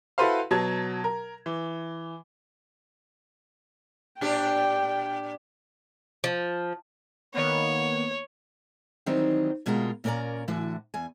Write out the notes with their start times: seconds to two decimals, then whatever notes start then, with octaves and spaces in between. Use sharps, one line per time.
0.18 E4 F#4 A4 B4 C5 F5
0.51 B2 F#3 A5 G#6
1.04 A#4
1.46 E3
4.21 A#2 D4 G4 G5
6.24 F3
7.34 D#3 A#3 B3 C#5
9.06 D#3 E3 F#3 G3 C4 D#4
9.66 D2 B2 G#3 A#3 F4 A#5
10.04 A#2 A#3 C#4 A#4 D5 A#5
10.48 A2 D3 E3 F#4
10.94 E2 G#5